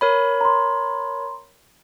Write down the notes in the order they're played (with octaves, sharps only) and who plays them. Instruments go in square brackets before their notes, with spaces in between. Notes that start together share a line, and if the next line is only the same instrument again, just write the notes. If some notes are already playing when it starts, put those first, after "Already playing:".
[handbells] A#4 C#5 B5
[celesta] A#5 C6